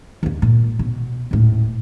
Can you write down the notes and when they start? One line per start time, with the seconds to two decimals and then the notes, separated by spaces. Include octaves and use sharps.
0.23 D#2 D3
0.42 A#2
0.79 B2
1.31 D#1 A2